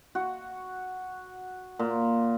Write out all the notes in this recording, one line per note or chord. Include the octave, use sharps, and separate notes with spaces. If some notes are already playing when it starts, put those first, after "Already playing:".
F#4
A#2